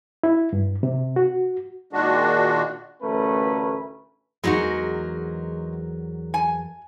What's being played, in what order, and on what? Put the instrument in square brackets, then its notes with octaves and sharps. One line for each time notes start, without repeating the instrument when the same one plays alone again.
[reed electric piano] E4
G2
C3
F#4
[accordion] A#2 D#3 G#3 D4 F#4
[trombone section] A1 D2 A3 C#4 A#4 B4
[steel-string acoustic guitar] E2 F#3 A#4 [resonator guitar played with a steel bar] G#3 D#4 F#4
[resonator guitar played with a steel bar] G#5